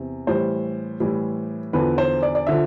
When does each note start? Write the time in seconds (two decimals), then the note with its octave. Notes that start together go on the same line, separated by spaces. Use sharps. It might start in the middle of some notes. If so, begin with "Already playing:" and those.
Already playing: E2 C3
0.27 A2 E3 G3 C5
1.00 A2 E3 G3
1.73 E2 D3 F3 B4
1.98 C5
2.23 D5
2.35 D5
2.47 D3 F3 E5